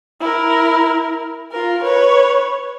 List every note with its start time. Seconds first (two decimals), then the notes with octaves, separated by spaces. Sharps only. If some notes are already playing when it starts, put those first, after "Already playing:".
0.20 E4 A#4
1.52 F4 A#4
1.83 B4 C#5